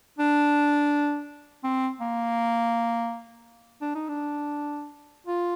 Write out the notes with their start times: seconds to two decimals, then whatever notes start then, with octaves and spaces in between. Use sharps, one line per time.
0.19 D4
1.63 C4
2.00 A#3
3.81 D4
3.95 D#4
4.09 D4
5.27 F4